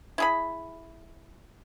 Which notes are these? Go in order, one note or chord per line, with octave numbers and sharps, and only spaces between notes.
E4 G#4 B5